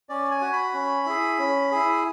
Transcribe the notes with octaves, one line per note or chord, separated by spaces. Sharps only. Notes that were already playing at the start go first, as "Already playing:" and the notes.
C#4 D5
G#5
F#4
B5
C#4
E4 G#4
C#4
E4 G#4